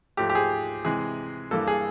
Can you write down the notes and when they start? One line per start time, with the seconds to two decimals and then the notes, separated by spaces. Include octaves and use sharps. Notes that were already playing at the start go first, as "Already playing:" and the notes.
0.17 G#2 F3 A3 G4
0.30 G4
0.35 G#4
0.85 C3 E3 G#3 G#4
1.51 G2 E3 G3 A#3 A4
1.68 G#4